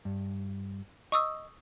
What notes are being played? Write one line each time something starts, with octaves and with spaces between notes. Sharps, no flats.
G2
D#5 C#6 D#6 E6